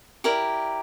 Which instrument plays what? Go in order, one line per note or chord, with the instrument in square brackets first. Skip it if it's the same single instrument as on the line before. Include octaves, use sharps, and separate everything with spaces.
[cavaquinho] E4 G4 A#4 D5